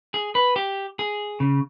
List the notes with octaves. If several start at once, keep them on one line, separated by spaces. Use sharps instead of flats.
G#4
B4
G4
G#4
C#3